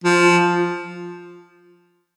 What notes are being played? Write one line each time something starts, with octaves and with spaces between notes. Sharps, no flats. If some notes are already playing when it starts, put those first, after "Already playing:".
F3